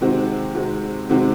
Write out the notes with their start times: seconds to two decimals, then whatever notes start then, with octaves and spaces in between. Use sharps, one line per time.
0.01 C3 D#3 G#3 C4 F#4
0.55 C3 D#3 G#3 C4 F#4
1.09 C3 D#3 G#3 C4 F#4